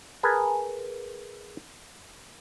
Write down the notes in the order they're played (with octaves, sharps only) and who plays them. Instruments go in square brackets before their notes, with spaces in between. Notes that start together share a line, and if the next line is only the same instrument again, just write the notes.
[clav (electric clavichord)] G#4 A#4 B4 G#5 A5